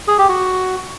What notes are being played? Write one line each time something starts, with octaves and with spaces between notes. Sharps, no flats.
G#4
G4
F#4